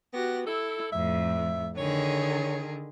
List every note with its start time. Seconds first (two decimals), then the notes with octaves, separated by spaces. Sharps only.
0.13 B3 F#4 G4 A#6
0.47 E4 A4
0.92 F2 A2 E5
1.78 D3 D#3 G#4 C#5